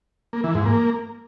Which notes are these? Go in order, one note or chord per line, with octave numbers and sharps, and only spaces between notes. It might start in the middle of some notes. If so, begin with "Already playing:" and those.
A#3
E3
G#2
A#3